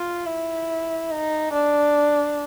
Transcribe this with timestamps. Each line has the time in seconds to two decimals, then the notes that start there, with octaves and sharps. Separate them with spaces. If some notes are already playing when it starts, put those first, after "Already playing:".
Already playing: F4
0.26 E4
1.11 D#4
1.53 D4